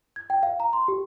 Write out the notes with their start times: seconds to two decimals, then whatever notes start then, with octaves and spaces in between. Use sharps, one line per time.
0.16 G#6
0.30 G5
0.43 F5
0.60 A#5
0.73 C6
0.88 G4